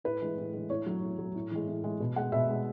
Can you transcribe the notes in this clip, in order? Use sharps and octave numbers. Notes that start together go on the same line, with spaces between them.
A2 B4
E3 G#3
A2
E3 G#3
A2 C#5
F#3
A2
F#3
A2
E3 G#3
A2
E3 G#3
B2
G#3 F#5
B2 E5
G#3